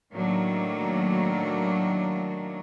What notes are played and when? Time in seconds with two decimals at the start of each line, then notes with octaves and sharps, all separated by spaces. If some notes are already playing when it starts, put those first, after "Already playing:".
0.13 A2 D#3 F#3 A3 A#3 D4